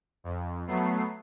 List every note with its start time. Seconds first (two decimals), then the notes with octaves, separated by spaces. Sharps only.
0.24 F2
0.67 F#3 A3 B3 C7